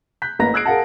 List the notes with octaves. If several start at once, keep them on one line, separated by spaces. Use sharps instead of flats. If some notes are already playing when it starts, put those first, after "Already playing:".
F#6 G6 B6
A1 A#3 B4 A#5 A#6
D#6 E6 F#6 G#6 C7 D7
G#4 A#4 F5 F#5 A5